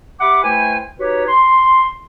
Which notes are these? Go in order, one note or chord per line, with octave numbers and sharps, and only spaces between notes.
G4 E5 F#5 B5 D6
A3 E4 B4 C5 G5 G#5
D#4 F#4 G4 B4 C#5
C6